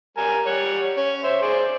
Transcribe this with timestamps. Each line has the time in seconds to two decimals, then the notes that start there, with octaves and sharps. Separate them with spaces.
0.17 G3 A#4 G#5
0.46 G3 C#5 F#5
0.97 C#4
1.23 C5 E5
1.42 G#4 C5 D5